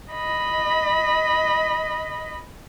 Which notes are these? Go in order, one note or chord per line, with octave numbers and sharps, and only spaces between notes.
D#5 B5